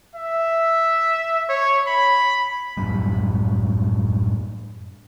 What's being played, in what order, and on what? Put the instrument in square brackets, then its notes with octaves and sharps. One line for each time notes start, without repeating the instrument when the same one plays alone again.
[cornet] E5
C#5
B5
[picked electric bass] F#2 A2 G3